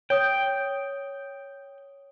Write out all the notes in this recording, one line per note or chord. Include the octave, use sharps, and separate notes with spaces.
C#5 G5 D#6 G6